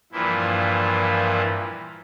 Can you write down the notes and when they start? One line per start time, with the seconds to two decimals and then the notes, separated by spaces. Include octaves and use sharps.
0.12 G2 A#2 E3 F3 E4